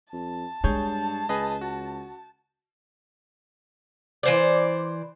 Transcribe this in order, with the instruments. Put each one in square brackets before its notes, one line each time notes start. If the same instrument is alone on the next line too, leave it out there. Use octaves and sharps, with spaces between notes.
[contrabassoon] F2 [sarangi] A5
[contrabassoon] G2 [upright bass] G#3 [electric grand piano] G#4 C#5 G6
[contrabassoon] C#2 [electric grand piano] G#4 B4 D#5
[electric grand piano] F#4
[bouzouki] E3 C5 D5